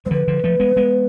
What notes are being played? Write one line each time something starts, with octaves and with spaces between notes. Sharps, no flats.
G#3 C5
D3 F3 B4
D3 F3
F3 A3
G#3 B3
G#3 B3